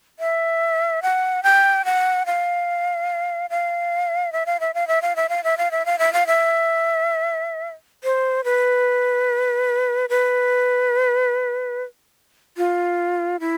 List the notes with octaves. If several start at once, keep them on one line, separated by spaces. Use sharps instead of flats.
E5
F#5
G5
F#5
F5
F5
E5
F5
E5
F5
E5
F5
E5
F5
E5
F5
E5
F5
E5
F5
E5
C5
B4
B4
F4
E4